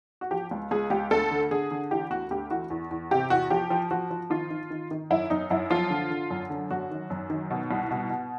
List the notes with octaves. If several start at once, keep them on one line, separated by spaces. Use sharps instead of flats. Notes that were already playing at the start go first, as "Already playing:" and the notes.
F#4
F3 G4
C#2
C#2 G#4
C#2 G4
D2 A4
D3
D3 G#4
D3
E3 G4
D2 F#4
D2 G4
E3 F#4
E2
E2
C3 G4
E2 F#4
F3 G4
F3
F3 F#4
F3
D#3 F4
D#3
D#3
D#3
F#2 E4
F#2 D#4
F#2 E4
F3 F4
D3
D3
F#2
D3
F#2 F#4
D#3
F#2
D#3
B2
C2
B2
B2